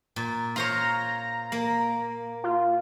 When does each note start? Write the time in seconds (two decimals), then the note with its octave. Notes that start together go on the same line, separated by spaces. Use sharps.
0.16 A#2
0.56 F4 C5 C#5 A#5
1.52 A#3
2.44 F4